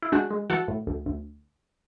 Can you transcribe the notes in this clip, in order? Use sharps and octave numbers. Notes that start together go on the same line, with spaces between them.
E4
G#3 D4 F#4
G#3
E3 F#4 A4
A2
D2
D2